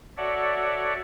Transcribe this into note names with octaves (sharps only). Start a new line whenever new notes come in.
F#4 A4 C#5 D5 E5 F#5